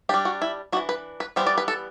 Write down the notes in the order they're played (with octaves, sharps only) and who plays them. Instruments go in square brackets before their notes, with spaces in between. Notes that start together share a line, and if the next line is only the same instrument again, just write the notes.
[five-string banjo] G3 D4 G4
F#4
E4
E3 A3 D4 F#4
B4
B4
E3 G3 B3 C5
D5
B4
A4